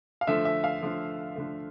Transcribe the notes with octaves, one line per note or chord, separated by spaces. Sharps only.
F5
D3 F3 A3 E5
E5
F5
D3 F3 A3
D3 F3 A3